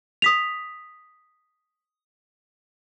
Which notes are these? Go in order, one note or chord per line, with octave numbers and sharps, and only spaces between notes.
D#6 B6 F7